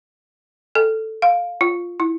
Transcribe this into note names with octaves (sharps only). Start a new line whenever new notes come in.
A4
F5
F4
E4